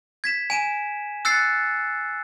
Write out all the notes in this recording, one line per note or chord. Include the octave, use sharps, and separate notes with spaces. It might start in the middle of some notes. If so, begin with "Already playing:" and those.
G#6 B6 E7
G#5 D#7 E7
E6 F#6 A6 C7 C#7